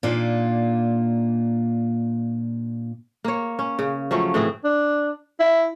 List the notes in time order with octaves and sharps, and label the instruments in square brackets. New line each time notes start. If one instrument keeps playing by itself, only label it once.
[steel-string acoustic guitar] A#2 A#3 D4 D#4 F4
[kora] A#3 C#5
C#4
C#3
F3 F#3 A3 C#4
A2 E3 C4 G#4
[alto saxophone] D4
E4